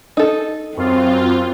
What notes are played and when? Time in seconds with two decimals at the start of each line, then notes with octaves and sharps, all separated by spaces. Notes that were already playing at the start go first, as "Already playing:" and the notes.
0.17 D#4 A4
0.77 F#2 C4 F4